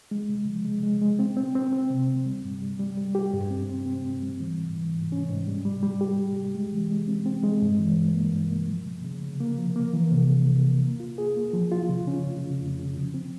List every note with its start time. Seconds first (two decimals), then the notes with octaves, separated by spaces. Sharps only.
0.11 G#3
0.29 C#3
0.48 F3
0.65 G#3
0.83 G#3
1.02 G#3
1.19 C4
1.36 C4
1.55 C4
1.73 C4
1.90 C3
2.08 C4
2.26 G3
2.44 G2
2.62 G3
2.79 G3
2.97 G3
3.15 G4
3.34 G2
3.51 C4
3.69 C4
3.86 C4
4.04 G2
4.22 G3
4.40 E3
4.58 G#2
4.75 E3
4.94 G#2
5.12 C#4
5.30 G#2
5.48 G3
5.65 G3
5.83 G3
6.01 G4
6.19 G3
6.36 G4
6.55 G#3
6.72 E3
6.90 G#3
7.08 C4
7.26 C4
7.43 G#3
7.62 G2
7.79 E3
7.97 G2
8.15 A#3
8.32 G2
8.51 A#3
8.69 F3
8.86 C#3
9.04 C#3
9.22 C#3
9.40 A#3
9.58 F3
9.76 A#3
9.93 E3
10.12 C3
10.29 C3
10.47 C3
10.65 A#3
10.83 A#3
11.00 F4
11.18 G#4
11.37 A#3
11.53 F3
11.72 F4
11.89 C#3
12.07 C#4
12.25 C#3
12.44 C#3
12.61 F2
12.79 C#3
12.97 F3
13.14 C4